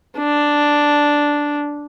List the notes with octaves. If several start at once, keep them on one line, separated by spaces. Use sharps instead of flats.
D4